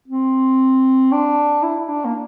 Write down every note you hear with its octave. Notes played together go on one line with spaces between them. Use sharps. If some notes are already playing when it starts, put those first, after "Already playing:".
C4
D4
E4
E4
D4
A#3